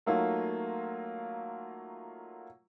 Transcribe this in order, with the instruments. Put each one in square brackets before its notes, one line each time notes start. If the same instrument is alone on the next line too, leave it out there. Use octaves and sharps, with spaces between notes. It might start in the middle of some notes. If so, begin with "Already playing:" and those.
[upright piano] F#3 A3 A#3 D#4 F4